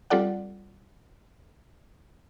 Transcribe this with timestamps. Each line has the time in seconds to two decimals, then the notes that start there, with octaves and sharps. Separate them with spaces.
0.10 G3 C4 F4 A4 D5 F#5